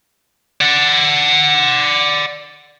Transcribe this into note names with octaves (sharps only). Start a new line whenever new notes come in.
D5 F#5